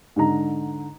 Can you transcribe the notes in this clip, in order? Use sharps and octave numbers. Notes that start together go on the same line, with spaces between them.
G#2 D3 A#5